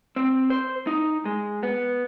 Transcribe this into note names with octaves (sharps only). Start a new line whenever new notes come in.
C4
C5
D#4
G#3
B3